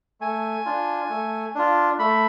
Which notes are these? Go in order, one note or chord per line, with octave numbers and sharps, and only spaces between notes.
A3 G#5
D4 F4
A3
D4 F4
A3 B5